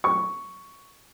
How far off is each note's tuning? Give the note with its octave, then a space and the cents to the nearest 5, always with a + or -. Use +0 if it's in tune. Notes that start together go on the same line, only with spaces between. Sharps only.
C#6 +5